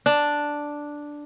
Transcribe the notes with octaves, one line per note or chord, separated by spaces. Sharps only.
D4